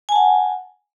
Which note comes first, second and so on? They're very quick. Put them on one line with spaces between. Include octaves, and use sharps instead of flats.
G#5 A5 F#5